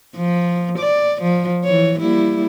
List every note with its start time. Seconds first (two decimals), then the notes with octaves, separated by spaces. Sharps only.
0.16 F3
0.78 D5
1.22 F3
1.64 E3 C#5
2.00 G3 A#3 E4